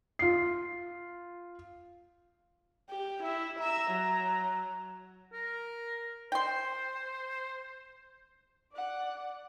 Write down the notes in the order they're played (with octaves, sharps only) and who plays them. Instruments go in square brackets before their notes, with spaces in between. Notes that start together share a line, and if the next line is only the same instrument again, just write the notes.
[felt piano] F4 C7
[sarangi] G4
[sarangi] E4 [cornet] E5
[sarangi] E5 [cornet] A#5
[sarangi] F#3
[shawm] A#4
[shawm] C5 [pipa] G5 C6
[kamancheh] D5 F#5